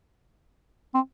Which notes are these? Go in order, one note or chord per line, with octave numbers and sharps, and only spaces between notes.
C4